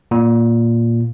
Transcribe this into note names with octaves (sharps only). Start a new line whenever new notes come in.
A#2